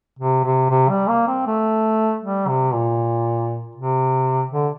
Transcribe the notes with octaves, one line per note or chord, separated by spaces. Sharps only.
C3
C3
C3
G3
A#3
C4
A3
G3
C3
A#2
C3
D3